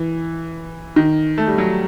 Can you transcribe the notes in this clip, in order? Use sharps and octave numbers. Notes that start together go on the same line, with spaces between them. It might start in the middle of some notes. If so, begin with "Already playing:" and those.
Already playing: E3
D#3
A3
G3
F#3